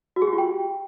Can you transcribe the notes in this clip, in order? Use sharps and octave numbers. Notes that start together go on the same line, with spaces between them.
F#4
G#4
G4
F4
G5